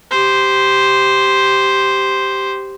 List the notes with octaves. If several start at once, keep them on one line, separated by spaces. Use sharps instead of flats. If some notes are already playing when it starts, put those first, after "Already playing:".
G4 C5